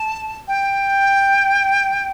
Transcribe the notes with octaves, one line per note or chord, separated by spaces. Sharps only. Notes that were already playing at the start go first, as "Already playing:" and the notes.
Already playing: A5
G5